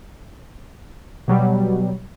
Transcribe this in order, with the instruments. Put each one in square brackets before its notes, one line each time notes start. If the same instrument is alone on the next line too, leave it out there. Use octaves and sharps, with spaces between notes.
[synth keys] B2 F#3 G3